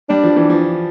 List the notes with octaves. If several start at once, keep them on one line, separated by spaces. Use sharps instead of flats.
G3 D4
F3
E3
F3